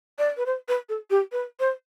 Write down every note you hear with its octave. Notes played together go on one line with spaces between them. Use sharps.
D5
B4
C5
B4
A4
G4
B4
C5